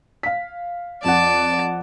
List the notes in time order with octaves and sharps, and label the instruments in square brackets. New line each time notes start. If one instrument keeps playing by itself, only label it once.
[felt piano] F5 B6
[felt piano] F2 F#5 [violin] D5 [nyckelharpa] A5